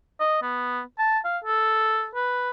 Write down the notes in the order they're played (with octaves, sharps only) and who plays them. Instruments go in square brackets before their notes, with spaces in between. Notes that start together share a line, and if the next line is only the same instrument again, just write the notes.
[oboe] D#5
B3
A5
F5
A4
B4